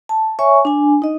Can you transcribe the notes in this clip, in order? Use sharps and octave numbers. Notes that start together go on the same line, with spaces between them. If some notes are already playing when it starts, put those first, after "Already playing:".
A5
C#5 E5 G#5 C#6
D4 G#5
D#4 D#5